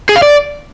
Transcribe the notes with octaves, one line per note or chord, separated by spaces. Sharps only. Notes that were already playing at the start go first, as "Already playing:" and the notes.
G#4
F5
D5